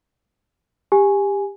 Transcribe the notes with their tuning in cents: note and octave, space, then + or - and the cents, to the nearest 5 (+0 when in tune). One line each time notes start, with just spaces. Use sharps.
G4 +20 G#5 +0